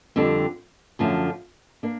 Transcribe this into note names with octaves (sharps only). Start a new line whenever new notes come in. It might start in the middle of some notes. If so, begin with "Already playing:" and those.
F2 D3 G3 C4
F#2 D3 F3 A3 C#4
A#3 D4